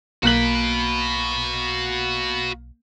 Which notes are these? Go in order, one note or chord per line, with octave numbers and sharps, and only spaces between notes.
B1 A#3 F#4 B5 F#6 F#7